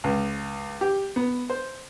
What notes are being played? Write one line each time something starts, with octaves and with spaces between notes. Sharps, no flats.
C#2
G4
B3
C5